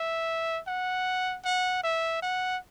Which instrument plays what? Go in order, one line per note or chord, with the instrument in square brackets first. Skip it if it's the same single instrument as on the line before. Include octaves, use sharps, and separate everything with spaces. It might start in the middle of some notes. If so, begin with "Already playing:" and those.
Already playing: [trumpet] E5
F#5
F#5
E5
F#5